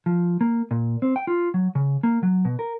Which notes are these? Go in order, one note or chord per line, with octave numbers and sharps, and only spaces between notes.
F3
A#3
A#2
C4
G5
F4
F#3
C#3
A#3
F#3
B2
A#4